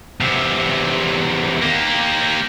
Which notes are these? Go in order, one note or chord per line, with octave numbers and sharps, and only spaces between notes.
E2 C3
A#3 G4